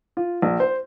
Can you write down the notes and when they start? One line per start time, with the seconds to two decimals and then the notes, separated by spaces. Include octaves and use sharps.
0.17 F4
0.42 A#1
0.60 C5